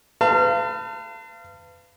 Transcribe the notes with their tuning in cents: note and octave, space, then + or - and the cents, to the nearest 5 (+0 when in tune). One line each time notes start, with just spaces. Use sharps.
B4 +30 F5 -30 A5 +35